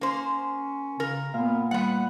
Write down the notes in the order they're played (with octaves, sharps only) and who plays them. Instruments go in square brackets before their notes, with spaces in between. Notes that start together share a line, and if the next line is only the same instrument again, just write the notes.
[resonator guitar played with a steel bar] A#3 C5 [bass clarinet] C#4
[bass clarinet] C#3 [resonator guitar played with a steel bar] A#4
[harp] A#2 F5 F6 [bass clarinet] B3
[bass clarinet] G3 [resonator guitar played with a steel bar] B3 F#5